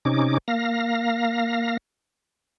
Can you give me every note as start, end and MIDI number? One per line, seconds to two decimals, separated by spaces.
0.05 0.38 48
0.05 0.38 61
0.05 0.38 63
0.05 0.38 86
0.48 1.77 58
0.48 1.77 77
0.48 1.77 94